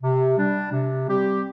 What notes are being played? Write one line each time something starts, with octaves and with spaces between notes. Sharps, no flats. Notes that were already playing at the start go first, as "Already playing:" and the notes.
C3
G3 D4
C3
G3 C4 G4